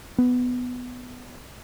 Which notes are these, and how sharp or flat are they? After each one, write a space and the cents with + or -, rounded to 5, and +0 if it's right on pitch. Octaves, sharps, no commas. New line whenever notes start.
B3 +10